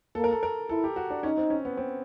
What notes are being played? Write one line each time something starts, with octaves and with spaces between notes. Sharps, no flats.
A#3 A4
A#4
A4
A#4
E4 A4
G4
F#4
D4
C#4 D#4
C4
C#4
B3
C4